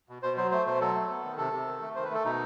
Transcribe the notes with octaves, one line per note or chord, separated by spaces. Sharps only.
B2
B2 C5
F#3 C5
A3 C5
B2 C5
F#3 A4
A3
B3
D#3
C3 A4
C3
D#3
A3
D#3 C5
B4
A3 A4
B2 D#4